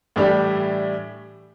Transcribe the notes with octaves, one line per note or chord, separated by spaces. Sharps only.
A2 E3 G3 D4 G4